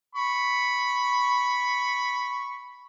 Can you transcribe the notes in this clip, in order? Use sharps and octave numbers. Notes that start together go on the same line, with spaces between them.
B5 C#6